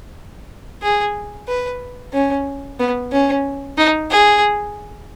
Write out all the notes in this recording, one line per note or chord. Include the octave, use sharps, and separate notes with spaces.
G#4
B4
C#4
B3
C#4
D#4
G#4